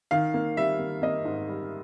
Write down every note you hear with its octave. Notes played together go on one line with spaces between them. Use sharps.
D#3 F5
A#3
G3 E5
A#3
A#3 D#5
G#2
G3